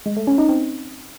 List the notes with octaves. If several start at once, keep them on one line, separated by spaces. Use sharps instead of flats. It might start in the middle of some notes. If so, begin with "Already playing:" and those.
G#3
A3
C#4
D#4
C4